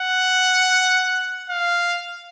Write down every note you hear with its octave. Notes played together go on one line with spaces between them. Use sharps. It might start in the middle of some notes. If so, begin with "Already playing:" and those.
Already playing: F#5
F5